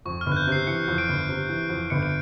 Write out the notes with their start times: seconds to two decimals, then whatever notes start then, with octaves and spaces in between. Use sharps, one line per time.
0.06 F2 C#6
0.21 G1 F6
0.32 F#6
0.37 G6
0.47 C3 C7
0.67 E3 C#7
0.88 F2
0.98 D7
1.08 G1
1.29 C3
1.49 E3
1.69 F2
1.90 G1 C#7
2.02 D7